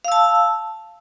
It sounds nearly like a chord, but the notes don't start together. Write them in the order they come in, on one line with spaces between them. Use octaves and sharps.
F5 E6 A5